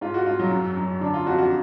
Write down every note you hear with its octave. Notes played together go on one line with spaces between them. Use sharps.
G#2 F4
F#4
G#2 F4
F#3
F#2
F#2
D3 D4
F4
F2 F#4
F#4